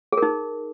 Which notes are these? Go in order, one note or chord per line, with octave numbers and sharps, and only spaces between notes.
G#4
A#4
D#4